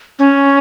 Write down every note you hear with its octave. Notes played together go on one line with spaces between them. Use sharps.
C#4